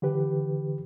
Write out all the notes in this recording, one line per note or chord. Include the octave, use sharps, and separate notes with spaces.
D3 E3 G4 B4